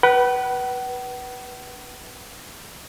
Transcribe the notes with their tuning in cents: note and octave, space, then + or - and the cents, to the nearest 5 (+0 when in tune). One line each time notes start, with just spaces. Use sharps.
B4 -10 F#5 +40